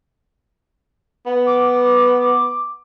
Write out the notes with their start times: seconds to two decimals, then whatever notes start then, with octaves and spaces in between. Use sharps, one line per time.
1.26 B3
1.46 D6